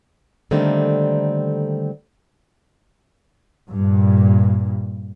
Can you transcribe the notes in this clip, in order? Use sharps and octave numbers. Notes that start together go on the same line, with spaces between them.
D3 D#3 G3 A3 A#3 C4
G2 A#2